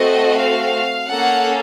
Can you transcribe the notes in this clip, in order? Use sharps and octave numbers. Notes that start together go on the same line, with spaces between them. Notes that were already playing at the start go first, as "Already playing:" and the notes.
Already playing: A3 C4 F#4 A4 D#5
F5
A#3 C#4 A4 F#5